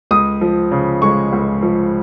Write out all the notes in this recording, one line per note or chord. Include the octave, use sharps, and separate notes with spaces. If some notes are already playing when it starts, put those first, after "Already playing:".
C#2 D#6
F3
C#3
G#3 C#6
C#2
F3